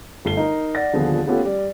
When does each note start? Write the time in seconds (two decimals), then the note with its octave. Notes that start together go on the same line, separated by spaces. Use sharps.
0.25 G1 A3 C7 G7
0.37 D#4 A#4
0.75 D5 F#5 A6 A#6
0.93 D#1 D3 F3 B3 G#4
1.27 A3 B3 C#4 F4 G4 A4
1.45 G3 D5